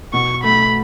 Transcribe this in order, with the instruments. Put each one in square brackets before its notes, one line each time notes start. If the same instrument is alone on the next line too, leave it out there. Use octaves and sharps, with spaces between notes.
[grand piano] B2 [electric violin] C#6
[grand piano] A3 [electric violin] B5